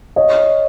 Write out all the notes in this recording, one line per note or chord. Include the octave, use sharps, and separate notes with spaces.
C#5 D#5